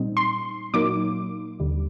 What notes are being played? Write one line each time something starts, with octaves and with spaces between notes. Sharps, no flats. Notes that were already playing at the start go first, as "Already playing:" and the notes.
Already playing: A#2 G3 C4 D#4
C6
A#2 F#3 A#3 D#4 D6
D#2 D3 G3